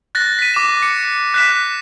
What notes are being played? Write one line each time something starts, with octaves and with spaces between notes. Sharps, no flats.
F#6 A6 A#6
B6 D#7
D6 E7
C#7
F#6 B6 E7